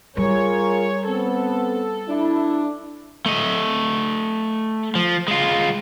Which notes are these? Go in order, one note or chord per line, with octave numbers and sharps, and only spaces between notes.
G3 F4 G#4 A#4 C#5
B3 C4 A4
D4 E4
A3 D#5
F3
G#3 F4